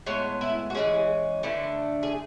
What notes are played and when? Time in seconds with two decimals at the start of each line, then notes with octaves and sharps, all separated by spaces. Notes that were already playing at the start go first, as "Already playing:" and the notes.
0.06 A2 G#3 B3 C#5
0.41 E4
0.70 F#4
0.74 E3 G#3 C#4 G#4
1.43 D3 A3 D4 B4
2.03 G#4